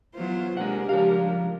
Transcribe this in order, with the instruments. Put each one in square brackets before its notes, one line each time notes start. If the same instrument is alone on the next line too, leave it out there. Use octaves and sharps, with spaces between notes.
[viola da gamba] E3 B3 C5 [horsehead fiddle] F#3 F4
[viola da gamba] C3 A#3 G4 [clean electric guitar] G#3 F#5 [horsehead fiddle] D4 A#4
[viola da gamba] C#3 G3 G#3 [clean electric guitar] F3 F5 [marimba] G4 C#5